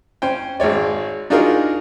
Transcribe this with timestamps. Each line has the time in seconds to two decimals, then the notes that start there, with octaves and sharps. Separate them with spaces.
0.22 C#4 C5 G5
0.60 G#1 G#3 C#5 D5
1.30 D4 D#4 F4 F#4 G#4 A#4